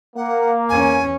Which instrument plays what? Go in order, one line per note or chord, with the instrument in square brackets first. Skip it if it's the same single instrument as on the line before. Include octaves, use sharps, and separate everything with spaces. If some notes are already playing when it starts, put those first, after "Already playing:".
[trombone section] A#3 [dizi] F#5
[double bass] E2 C#4 [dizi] G#5